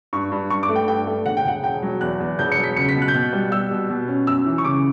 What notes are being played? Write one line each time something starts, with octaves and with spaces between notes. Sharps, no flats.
G2 C#6
G2
G2 C#6
D6
A3
G5
G2 G5
A3
E1 F#5
G5
E1 F#5
E1 G5
F#3
E2 F#6
E2
E1 G6
C#7
F#3
B6
C#2 C#7
B6
B2
F#6
G6
B2 F#6
G3
G3 E6
B2
B2
C#4
F#2 E6
E3
C#6
C#3 D6